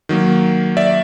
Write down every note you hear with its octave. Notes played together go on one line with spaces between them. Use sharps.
D#3 F#3 A#3
D5 E5